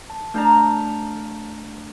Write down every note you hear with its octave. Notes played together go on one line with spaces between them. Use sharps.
A5
A3 D4 F5 A5 A#5 G6